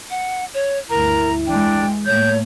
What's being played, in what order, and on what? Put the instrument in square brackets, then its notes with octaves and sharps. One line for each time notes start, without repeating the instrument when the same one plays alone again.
[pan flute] F#5
C#5
[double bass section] D2 G2 [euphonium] E4 [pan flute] A#4 [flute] A#5
[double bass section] E3 G#3 [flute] D4 [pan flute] G5
[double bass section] A2 A3 A#3 [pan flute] C#5 [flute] G6